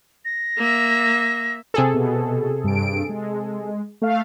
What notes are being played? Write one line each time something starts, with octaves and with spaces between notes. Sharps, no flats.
A#6
A#3 E5
C3 G#4 A4
B2
G2 D7
G#3
A3 F5